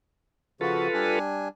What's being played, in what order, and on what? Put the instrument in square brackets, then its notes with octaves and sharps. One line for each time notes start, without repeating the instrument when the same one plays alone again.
[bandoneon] C#3 F3 F#4 [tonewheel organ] F4 A4 B4
[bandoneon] G3 D4 G#5